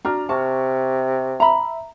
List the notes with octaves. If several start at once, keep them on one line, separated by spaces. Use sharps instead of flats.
D4 F#4 A#5 F6
C3 A5 C#6
E5 A#5 B5